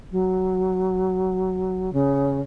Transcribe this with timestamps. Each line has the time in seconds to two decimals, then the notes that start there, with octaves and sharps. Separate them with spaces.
0.11 F#3
1.93 C#3